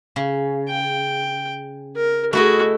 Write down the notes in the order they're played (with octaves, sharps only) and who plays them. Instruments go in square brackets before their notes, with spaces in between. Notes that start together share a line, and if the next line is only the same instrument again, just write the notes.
[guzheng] C#3
[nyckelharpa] G5
A#4
[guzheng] A3 E4 D#5 [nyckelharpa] F#4 G#4